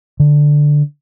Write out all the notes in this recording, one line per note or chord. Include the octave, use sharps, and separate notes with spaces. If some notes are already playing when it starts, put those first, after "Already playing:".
D3